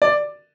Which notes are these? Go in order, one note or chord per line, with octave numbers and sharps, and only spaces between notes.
D5